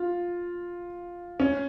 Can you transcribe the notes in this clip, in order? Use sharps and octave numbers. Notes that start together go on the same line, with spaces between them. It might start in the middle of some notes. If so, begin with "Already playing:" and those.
Already playing: F4
C#4